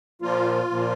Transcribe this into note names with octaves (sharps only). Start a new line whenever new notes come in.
A#2 F3 A#3 F4
A#2 F3 A#3